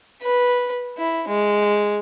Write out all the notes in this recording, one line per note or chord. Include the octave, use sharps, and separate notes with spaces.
B4
E4
G#3